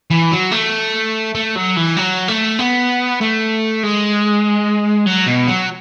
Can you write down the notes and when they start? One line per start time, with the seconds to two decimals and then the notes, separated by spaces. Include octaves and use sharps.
0.10 E3
0.32 F#3
0.52 A3
1.35 A3
1.56 F#3
1.76 E3
1.97 F#3
2.28 A3
2.59 B3
3.21 A3
3.83 G#3
5.07 F#3
5.28 B2
5.48 F#3